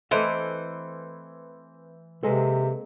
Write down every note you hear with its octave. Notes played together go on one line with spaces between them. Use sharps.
E3 A3 C4 A4 C5 D#5 E5
C3 G#3 A#3 C4 A4 B4